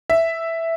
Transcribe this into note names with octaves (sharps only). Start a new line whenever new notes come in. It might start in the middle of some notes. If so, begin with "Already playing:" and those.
E5